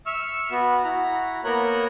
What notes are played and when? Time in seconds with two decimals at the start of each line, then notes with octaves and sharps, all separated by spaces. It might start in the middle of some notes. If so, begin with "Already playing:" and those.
0.06 E5 C#6 E6 F6
0.51 B3 F#4
0.84 E4 F#4 A#5
1.44 A#3 B3 A#4 C#5 A#5 F#6